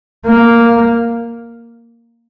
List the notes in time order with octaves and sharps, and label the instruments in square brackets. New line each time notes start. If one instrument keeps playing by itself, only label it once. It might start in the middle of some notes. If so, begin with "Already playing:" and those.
[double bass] A#3